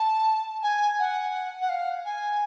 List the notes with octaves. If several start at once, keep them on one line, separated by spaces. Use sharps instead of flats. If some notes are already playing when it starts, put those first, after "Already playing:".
Already playing: A5
G#5
F#5
F#5
F5
G#5